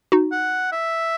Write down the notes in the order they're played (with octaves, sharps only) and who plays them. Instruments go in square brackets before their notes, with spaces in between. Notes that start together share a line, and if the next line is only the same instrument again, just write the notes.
[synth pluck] D#4 F#4
[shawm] F#5
E5